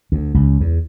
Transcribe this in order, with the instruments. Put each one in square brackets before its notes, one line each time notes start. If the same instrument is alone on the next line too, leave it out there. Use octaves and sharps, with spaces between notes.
[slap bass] D2
C#2
E2